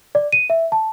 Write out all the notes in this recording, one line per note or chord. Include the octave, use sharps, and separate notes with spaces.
D5
D#7
E5
A5